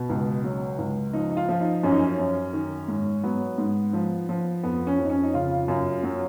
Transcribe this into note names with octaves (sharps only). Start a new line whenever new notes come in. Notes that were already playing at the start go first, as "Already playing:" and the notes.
Already playing: B2
C#2
F#3
C#2
F3 D#4
D#4
F4
F3 F4
D#4
F#2 C#4
D#4
C#4
F#2
D#3
G#2
F#3 B3
G#2
F3
F3
F2 B3
C#4
F2
D#4
C#4
D#4
C#3 F4
F#2
F#3